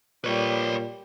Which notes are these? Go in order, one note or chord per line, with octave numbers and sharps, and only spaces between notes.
A#2 G3 B4 C#5